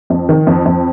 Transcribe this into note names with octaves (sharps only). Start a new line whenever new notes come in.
F2
D#3
F2
F2